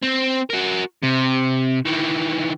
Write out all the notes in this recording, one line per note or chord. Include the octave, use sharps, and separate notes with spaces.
C4
F#4 A#4
C3
D#3 E3